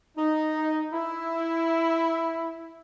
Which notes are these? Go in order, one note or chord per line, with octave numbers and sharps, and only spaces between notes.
D#4
E4